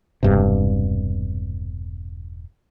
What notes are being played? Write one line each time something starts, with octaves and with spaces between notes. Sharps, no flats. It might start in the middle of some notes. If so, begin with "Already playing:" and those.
E1 G2 C3